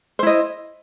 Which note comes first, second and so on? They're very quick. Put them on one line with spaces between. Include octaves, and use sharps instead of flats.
C5 E4 D#5